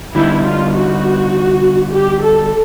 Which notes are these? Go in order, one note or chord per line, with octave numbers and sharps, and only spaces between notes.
D3 G3 B3 D#4 E4
F4
F#4
G4
A4